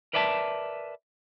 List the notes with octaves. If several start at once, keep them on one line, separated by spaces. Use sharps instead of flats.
A#4 B4 D5 E5 G5 A5